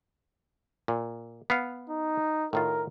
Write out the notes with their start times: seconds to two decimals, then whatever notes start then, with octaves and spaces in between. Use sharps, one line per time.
0.88 A#2
1.50 B3 F5
1.90 D#4
2.53 A2 D#3 F4 A#4